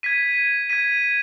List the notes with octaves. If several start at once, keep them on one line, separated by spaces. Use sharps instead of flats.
G#6 B6 D#7
G#6 B6 D#7